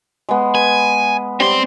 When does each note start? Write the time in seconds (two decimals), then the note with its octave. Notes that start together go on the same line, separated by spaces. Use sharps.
0.29 G#3 B3
0.55 B4 G#5
1.40 G3 C4 C5 C6